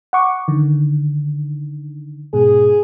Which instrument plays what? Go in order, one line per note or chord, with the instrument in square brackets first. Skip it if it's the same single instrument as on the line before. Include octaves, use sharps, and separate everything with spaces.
[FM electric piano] F#5 C#6 D6
D3 D#3
[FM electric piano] G#2 B2 [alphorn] G#4